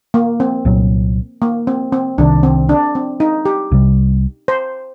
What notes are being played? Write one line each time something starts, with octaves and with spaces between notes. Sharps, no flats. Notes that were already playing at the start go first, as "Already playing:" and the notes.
A#3
C4
C2 A#2 F#3
A#3
C4
C4
C2 C3 D#3 D4
C4
D4
C4
D#4
G4
C2 C3 G3
C5